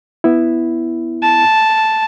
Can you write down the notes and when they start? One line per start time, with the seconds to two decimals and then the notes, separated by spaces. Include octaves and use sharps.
0.24 B3 E4
1.23 A5